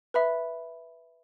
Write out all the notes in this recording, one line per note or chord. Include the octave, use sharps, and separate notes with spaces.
B4 E5 B5